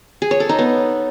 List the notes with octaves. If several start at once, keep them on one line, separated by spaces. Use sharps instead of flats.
G#4
C#5
A4
D#4
B3